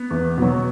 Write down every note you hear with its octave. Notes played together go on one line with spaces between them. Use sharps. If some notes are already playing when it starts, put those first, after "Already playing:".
Already playing: B3
E2
B2 F#3